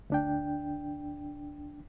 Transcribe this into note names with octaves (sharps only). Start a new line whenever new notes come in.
D2 D4 G5